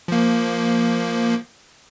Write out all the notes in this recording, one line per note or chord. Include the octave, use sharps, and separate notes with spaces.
F3 A#3